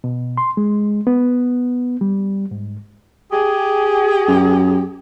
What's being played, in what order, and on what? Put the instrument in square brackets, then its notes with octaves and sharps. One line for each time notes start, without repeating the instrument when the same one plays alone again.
[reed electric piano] B2
C6
G#3
B3
G3
G#2
[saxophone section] G4 G#4
[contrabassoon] F#2